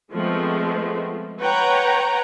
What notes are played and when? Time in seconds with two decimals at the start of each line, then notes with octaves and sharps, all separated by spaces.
0.11 F3 G#3 A3 B3 C4
1.41 B4 C#5 F#5 G5 A#5